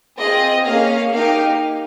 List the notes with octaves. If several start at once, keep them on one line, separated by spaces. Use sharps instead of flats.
C4 F4 G#4 D#5
A#3 C#4 G#4 F5
A#3 D#4 G4 F5